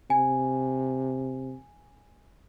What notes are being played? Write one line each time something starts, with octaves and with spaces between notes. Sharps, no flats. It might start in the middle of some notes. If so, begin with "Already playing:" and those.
C3 G#5